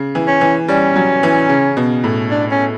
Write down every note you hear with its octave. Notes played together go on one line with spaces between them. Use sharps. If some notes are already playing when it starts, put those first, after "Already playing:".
Already playing: C#3
E3
C#4
E3
G3 C#4
F#3
E3
C#3
B2
A2
D4
C#4